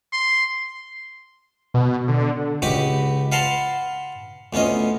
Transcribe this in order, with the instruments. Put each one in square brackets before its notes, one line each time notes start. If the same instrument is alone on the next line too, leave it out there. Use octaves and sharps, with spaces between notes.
[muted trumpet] C6
[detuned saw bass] B2
D3
[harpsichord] C#2 F#4 G4 B4 B5 D6
B4 F5 F#5 A5 A#5 C6
D2 B3 C#4 F4 D#5